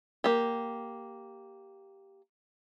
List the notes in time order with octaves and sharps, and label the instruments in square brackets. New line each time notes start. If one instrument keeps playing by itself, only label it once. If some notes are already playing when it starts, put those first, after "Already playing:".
[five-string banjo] A#3 G4